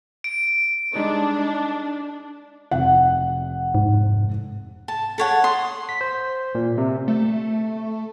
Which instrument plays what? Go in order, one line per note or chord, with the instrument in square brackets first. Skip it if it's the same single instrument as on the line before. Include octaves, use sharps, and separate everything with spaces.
[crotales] D7
[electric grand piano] G3 G#3 D#4 [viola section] D4
[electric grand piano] D#4
[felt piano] F1 F#5
[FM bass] G#2
[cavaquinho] A5
A4 C#5 F#5
C6 D#6
[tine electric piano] B6
C5
A#2
C3
[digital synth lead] A3